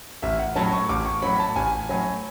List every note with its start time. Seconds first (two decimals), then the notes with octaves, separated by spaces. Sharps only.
0.22 A1 E5
0.39 F#5
0.56 A2 F#3 C#4 A5
0.72 C#6
0.89 A1 D6
1.05 C#6
1.22 A2 F#3 C#4 B5
1.39 A5
1.56 A1 G#5
1.89 A2 F#3 C#4